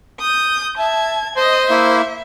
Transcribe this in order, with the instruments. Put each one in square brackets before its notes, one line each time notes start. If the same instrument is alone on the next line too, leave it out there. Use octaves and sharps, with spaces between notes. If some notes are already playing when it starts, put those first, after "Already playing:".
[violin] D#6 G6
[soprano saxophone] E5 [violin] A5 G#6
[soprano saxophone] C5 [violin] D#5 D#6
[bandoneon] A#3 E4 [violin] E5